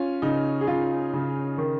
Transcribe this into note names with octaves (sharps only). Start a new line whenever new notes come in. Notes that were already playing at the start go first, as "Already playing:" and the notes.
Already playing: C#4 F4
C#3 D#4
G#4
C#3 F4
C#3
D#3